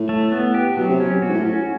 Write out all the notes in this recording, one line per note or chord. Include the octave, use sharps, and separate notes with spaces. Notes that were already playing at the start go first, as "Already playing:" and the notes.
Already playing: A2
A3
B3
G4
B2 F#3
C3
B2 C#4
B2 F#4
G#2
A2
A2 C#4